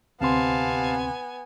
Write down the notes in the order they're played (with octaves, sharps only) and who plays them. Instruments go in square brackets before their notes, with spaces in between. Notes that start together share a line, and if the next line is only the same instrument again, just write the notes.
[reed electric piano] D2 C4 C6 [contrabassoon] C3 [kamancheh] B3 G#5 [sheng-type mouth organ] F5 A5